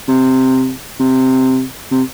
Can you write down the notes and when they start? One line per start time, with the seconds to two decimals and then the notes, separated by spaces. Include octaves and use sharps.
0.08 C3
1.00 C3
1.91 C3